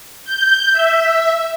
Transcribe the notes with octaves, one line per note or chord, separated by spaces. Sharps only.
G6
E5